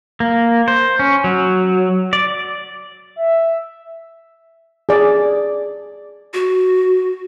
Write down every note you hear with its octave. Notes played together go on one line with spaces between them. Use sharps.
A#3
C5
C#4
F#3
D5
E5
G#4 D5
F#4